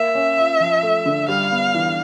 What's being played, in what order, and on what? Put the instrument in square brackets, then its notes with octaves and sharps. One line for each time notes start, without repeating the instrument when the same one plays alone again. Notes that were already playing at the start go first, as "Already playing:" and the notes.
Already playing: [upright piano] A#3 [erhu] E5
[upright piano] C#4
F4
F3
A3
D3
[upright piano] G3 [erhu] F5
[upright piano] B3
E3